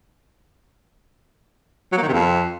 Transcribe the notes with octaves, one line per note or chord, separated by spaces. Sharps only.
F#3
A#3
D#3
C3
F2